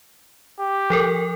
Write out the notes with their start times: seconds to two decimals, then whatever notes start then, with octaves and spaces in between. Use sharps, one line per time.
0.60 G4
0.90 F3 A4 A#4